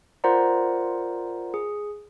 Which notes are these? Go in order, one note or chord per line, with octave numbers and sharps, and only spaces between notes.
F4 A#4 C5 D5 F#5 A#5
G#4